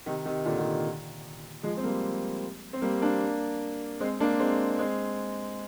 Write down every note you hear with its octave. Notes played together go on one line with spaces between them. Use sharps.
C3 D#3
C3 D#3
A#2 D3
C3 D#3
F3 G#3
C4
G3 A#3
C4
G3 A#3
A#3 D4
G#3 C4
A#3 D4
G#3 C4
G#3 C4